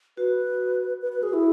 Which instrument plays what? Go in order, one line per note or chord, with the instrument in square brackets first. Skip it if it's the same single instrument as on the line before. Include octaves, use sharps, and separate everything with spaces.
[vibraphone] F#4 [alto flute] B4
[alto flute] B4
B4
G#4
E4